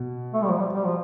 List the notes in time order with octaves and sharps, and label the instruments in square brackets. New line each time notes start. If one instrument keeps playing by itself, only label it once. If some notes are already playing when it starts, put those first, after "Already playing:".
Already playing: [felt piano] B2
[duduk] A3
G3
F3
G3
G3
F3